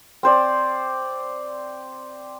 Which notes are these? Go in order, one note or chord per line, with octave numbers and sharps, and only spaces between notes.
C4 C5 D5